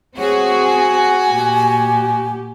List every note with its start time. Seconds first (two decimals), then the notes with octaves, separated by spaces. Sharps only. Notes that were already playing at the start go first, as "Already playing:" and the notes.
0.17 C4 F#4 G#4 C#5
0.66 G#5
1.31 A#2 G4